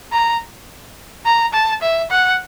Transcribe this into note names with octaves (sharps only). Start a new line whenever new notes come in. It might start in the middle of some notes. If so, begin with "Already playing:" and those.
A#5
A#5
A5
E5
F#5